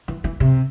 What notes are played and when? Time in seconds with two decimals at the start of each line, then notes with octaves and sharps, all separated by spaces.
0.08 E3
0.24 E3
0.40 C3